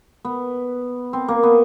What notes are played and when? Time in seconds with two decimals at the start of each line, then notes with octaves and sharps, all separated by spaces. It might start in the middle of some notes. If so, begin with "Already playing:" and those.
0.25 B3
1.13 C4
1.28 A#3
1.43 B3